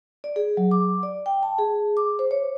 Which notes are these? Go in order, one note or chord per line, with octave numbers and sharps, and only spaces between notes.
D5
G#4
F#3
D6
D5
G5
A5
G#4
D6
C5
C#5